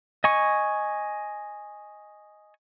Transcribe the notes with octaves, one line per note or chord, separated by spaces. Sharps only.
D#5 G#5 C#6